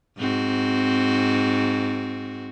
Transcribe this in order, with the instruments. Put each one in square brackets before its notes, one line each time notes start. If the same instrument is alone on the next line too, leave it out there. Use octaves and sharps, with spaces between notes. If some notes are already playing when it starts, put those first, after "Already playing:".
[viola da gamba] G#2 C4 F#4